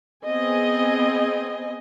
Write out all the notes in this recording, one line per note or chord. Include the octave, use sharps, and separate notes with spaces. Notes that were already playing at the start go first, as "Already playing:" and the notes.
B3 C4 G#4 D#5 G#5